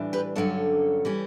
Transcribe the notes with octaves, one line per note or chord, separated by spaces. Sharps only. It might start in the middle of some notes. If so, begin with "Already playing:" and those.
Already playing: A2 E3 G3 D4
G4 B4
G2 D3 F#3 C#4 A4 C#5
E3 G3 C#4